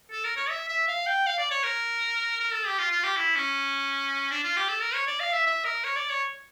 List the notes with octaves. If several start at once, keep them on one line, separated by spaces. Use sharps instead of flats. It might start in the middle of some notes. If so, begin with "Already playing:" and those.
A4
A#4
C#5
E5
E5
F5
G5
F5
D5
C#5
A#4
A#4
A4
G4
F4
F4
G4
E4
C#4
D4
F4
G4
A4
A#4
C#5
D5
F5
E5
E5
A#4
C#5
D5
C#5